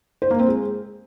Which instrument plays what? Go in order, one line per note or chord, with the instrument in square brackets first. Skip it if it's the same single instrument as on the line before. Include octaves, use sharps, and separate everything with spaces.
[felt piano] C5
A#3
C4
G#3